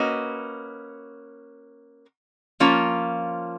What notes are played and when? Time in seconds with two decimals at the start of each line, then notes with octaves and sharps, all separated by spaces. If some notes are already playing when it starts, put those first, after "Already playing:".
Already playing: A#3 C#4 F#4 B4 D#5
2.60 F3 A#3 C#4 F4